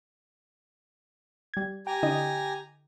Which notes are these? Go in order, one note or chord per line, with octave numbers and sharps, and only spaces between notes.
G3 G#6
G4 G5 G#5 A#5
D3 E4 D#5